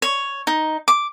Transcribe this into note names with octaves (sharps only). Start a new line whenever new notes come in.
C#5
D#4
D6